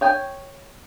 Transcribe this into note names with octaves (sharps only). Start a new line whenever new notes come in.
C#5 G5 G#5